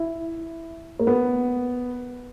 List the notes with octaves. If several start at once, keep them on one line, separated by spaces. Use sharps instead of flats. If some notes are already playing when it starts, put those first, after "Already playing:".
Already playing: E4
A#3
B3